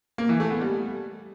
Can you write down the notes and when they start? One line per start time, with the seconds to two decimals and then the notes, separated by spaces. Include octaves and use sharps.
0.18 A#3
0.29 E3
0.40 A3
0.51 B3
0.61 G3